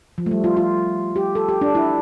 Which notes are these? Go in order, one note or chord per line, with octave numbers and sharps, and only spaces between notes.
F3
A3
G3
F4
F4
G4
A4
G4
D4
E4